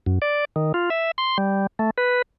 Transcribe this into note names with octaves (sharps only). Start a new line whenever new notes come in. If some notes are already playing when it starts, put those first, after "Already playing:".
F#2
D5
D#3
F4
E5
C6
G3
A3
B4